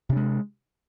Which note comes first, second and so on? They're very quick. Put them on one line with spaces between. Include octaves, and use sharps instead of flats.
C3 D4 G#3